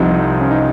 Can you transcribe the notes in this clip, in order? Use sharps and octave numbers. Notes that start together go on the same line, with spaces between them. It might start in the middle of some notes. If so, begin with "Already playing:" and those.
Already playing: C2 C3 F3 D#4
C#4
D#4